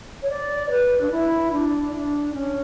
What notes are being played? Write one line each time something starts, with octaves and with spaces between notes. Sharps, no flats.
C#5
D5
B4
D4
E4
D4
D4
C#4